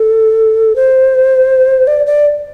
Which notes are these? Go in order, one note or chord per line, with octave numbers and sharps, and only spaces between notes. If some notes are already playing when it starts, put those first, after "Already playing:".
Already playing: A4
C5
D5
D5